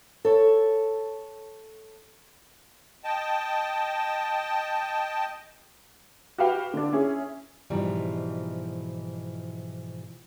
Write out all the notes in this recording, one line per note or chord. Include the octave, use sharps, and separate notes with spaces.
A4 C#5
D#5 G5 A5
F#4 G4 B4 F5 G5
D3 D4
C#4 E4 G#4
G#2 B2 E3 F3 G3